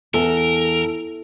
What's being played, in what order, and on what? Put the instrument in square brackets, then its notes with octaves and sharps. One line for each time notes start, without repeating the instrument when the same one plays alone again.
[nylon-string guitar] E2 [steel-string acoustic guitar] A4 [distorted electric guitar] A#4